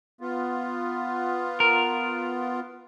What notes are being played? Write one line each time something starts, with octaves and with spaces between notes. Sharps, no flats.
B3 F4
A#4